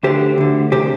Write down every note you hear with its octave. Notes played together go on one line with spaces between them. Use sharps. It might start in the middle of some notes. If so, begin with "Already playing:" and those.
D2 D3 G4 C5
D2 D3
C3 G4 C5